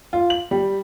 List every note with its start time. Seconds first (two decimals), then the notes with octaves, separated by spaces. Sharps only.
0.13 F4
0.30 F#7
0.51 G3